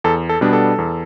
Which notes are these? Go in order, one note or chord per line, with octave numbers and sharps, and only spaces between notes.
E2 A4
A4
B2 G3 B3 D4
A4
E2